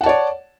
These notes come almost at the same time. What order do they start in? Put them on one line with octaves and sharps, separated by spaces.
F#5 A5 C#5 D5